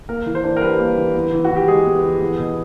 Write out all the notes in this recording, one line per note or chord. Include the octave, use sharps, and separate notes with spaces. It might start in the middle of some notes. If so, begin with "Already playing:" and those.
A#3 A#4
E3
C5
D4
A#4
G3 B4
A#3
E3
B3
E3
F#4
E3
G4
G#3 G#4
B3
E3
B3
B2